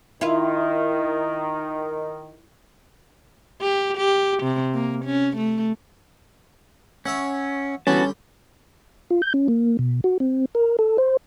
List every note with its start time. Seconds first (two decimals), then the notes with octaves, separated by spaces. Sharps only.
0.21 D#3 E4 F4
3.62 G4
3.98 G4
4.43 C3
4.74 A#3
5.05 C#4
5.37 A3
7.06 C#4 C#5 E5 F#5
7.87 D3 E3 G3 B3 C#4 F#4 A5
9.10 F4
9.22 G6
9.34 C#4
9.48 A#3
9.79 B2
10.04 F#4
10.20 C4
10.55 A#4
10.79 A4
10.98 C5